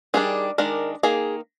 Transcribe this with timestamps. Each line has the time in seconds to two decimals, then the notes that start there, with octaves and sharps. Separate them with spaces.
0.14 D#3 G3 D4 G#4
0.58 D#3 G#3 D4 A#4
1.03 D#3 A#3 D#4 G#4